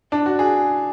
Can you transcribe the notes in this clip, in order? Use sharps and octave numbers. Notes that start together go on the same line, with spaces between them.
D4
F#4
G#4